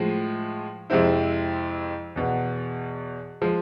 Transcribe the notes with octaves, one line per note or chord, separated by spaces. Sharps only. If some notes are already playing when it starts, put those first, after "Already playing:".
Already playing: A2 F3 G#3
F2 C3 G#3 C4 E4
E2 B2 B3
F3 G#3